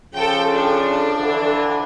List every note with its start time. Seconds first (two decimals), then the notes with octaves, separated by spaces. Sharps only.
0.13 C#3 F3 A4 G5
0.53 D4 A4
1.18 D3 E3 F3